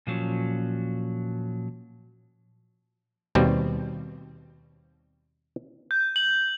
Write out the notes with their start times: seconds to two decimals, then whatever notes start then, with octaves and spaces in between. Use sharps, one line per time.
0.07 A#2 F3 F#3 C#4
3.35 D#2 B2 G3 C4
5.91 G6
6.16 F#7